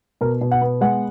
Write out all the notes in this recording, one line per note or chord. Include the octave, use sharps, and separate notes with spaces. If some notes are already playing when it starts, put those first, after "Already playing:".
B2 A#4
B2
F#5
B3
G#3 F#5